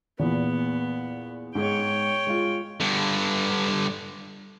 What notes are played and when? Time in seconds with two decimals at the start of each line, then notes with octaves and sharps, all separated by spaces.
0.19 E2 A#2 E3 B3
1.55 G#2 G#4 C#5 G5
2.27 G#3 F4
2.80 G2 D3